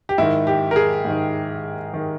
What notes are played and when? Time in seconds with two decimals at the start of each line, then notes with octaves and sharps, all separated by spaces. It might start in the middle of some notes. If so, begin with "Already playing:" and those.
0.09 G4
0.18 G#2 D#3 E4
0.47 G4
0.71 A#4
0.76 G#4
1.05 G#2 D#3
1.94 D#3